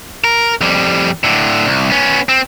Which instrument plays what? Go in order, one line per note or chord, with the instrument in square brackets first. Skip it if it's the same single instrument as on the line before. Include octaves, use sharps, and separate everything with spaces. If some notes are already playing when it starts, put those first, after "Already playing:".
[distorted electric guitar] A#4
F2 G3
A2 D3
C2
B3 C#4
C4